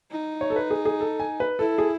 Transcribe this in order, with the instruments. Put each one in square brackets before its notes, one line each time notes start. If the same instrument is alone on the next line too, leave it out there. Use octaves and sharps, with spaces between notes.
[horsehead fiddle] D#4
[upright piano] C#5
A4
B4
G#4
G#4
A4
G#5
B4
[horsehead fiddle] E4 [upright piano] A4
[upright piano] G#4